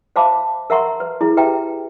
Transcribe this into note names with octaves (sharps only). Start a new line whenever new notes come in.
C5 E5 F5 A5 B5 D6
A#4 E5 F#5 A#5 C6 C#6
B4
E4 G#4
G4 B4 E5 G5 A#5